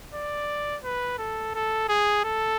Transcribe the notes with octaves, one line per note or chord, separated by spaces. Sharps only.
D5
B4
A4
A4
G#4
A4